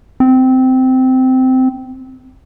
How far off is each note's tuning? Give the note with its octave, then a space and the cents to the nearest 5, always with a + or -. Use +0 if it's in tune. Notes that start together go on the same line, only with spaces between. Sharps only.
C4 -15